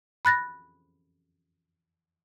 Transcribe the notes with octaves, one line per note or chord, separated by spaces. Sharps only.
B5 F#6 A6 A#6